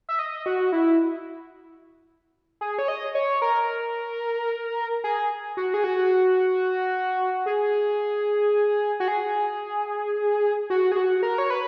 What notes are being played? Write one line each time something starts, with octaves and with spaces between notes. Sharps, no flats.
E5
D#5
F#4
E4
G#4
C#5
D#5
C#5
A#4
G#4
F#4
G#4
F#4
G#4
F#4
G#4
F#4
G#4
F#4
A#4
C#5
B4